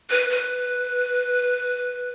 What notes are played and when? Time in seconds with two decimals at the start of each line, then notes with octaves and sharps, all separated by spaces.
0.10 B4
0.30 B4